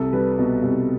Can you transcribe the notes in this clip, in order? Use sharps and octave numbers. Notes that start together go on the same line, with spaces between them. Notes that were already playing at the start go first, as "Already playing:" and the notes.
Already playing: C2 A4
G3 B4
B2
C2